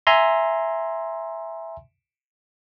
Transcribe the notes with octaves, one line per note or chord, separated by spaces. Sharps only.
E5 G#5 A#5 C6